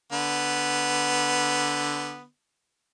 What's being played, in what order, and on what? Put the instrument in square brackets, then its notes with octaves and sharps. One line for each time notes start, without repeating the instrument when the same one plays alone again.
[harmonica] D3 B3